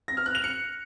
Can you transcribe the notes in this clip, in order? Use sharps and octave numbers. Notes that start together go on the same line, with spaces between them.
A#6
F6
F#6
F7
C#7